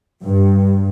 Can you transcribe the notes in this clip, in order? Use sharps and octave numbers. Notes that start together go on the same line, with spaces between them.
G2